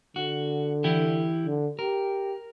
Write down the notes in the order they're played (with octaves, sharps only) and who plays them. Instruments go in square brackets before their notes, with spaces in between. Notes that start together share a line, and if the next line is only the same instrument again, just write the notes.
[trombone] D3 [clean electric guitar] F#4
[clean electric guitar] E3 E4 G4
[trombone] D3
[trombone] G4 [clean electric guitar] A#4